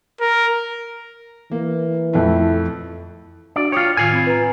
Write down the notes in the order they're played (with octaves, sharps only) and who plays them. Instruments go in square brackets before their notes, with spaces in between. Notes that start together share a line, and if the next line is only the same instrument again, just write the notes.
[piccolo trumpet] A#4
[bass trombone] E3 [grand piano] A#3
[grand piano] F2 A3 [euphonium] E4
[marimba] D4 F#4 [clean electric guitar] D5
[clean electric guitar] F4 C#5 [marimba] G5 D6 D#6
[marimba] A2 D#3 [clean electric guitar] F4 G#5
[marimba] C4 B5
B4 A#5